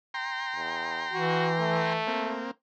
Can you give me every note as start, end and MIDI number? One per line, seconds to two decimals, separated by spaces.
0.14 1.93 79
0.14 1.93 82
0.14 1.93 84
0.56 1.06 40
1.12 2.05 52
1.12 1.51 66
1.60 2.40 57
2.07 2.51 58
2.07 2.51 60